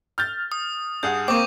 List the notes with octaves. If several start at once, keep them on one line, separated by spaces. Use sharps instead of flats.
F6 G6 A6
D#6
G2 G#4 F#5 G6
A#3 C4 C#6 D6